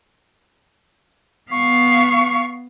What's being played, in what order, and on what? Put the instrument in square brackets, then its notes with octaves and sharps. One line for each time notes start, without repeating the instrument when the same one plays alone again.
[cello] B3 F5 [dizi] C#6